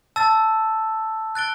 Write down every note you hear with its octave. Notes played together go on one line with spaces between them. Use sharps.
A5 E6 A6
F#6 A6 D7 G7